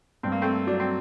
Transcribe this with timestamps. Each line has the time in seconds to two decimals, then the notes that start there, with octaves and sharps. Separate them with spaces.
0.23 G2 C4
0.32 A#3
0.42 A3 C4
0.67 F#3 D4
0.80 C4